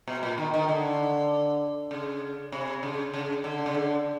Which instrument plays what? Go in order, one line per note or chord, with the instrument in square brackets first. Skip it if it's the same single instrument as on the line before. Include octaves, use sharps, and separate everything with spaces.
[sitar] B2
A#2
D#3
D#3
D3
C#3
C3
C#3
C#3
D3
C#3
D3